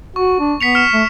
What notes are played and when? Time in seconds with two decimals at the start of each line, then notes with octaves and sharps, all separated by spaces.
0.16 F#4 C#6
0.39 D4
0.61 B3 B6 C#7 F7
0.75 F6 C#7 E7
0.93 A3